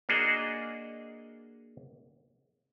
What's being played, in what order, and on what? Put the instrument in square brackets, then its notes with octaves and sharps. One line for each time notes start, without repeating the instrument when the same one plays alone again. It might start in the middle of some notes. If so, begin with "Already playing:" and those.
[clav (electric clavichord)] A#3 D4 F#4 G#4 D#5